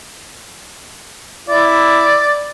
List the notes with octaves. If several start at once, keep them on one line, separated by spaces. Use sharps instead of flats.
E4 D5